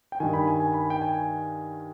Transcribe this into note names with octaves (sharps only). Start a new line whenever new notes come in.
G5
G2 D#3 G#5
B5
G#5
G#5
B5
G5
G#5